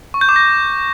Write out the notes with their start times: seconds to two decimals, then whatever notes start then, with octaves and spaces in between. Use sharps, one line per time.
0.14 C#6
0.21 G6
0.29 D6
0.36 A#6